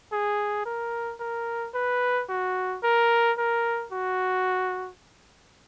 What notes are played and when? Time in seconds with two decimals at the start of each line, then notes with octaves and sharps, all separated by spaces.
0.12 G#4
0.66 A#4
1.20 A#4
1.74 B4
2.29 F#4
2.83 A#4
3.38 A#4
3.92 F#4